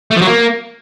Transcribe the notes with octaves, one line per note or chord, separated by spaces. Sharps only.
A3
F3
F#3
A#3